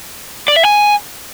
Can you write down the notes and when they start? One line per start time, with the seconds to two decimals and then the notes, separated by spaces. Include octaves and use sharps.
0.48 D5
0.56 E5
0.65 G#5